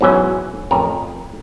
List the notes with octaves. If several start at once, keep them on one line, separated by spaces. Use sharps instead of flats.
G#2 B2 E3 F#3 C#4
A1 F2 A#4